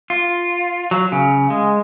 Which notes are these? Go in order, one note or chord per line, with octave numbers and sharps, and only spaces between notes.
F4
F#3
C#3
G#3